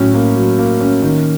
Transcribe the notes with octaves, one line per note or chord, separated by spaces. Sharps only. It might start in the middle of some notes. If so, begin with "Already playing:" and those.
Already playing: A2 F#3 C#4
A#3
F#3
A#3
C#4
D#3